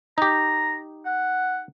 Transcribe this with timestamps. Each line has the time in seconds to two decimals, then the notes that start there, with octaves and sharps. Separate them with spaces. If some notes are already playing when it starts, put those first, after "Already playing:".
0.18 D#4 G4 A#5
1.06 F#5